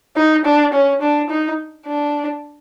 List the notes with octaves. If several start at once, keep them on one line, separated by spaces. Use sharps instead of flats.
D#4
D4
C#4
D4
D#4
D4